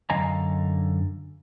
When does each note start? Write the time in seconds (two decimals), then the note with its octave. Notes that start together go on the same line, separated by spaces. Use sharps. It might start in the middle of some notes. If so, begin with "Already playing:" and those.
0.10 F#2 D3 D#5 F5 G#5 A#5